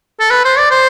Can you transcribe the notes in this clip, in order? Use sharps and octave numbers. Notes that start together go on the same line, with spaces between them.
A4
B4
C5
D5
C5